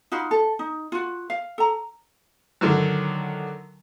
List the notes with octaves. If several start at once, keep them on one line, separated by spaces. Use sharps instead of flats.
D#4 F4 F#4 B5
A4
D#4
F4 F#4
F5
A4 A#5
D3 D#3 F#3